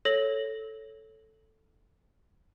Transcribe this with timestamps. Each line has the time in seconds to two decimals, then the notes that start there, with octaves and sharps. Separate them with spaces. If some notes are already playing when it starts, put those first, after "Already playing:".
0.05 A4 C#5 A#6 F#7